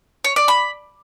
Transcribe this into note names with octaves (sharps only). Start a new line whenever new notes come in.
C#5
D5
B5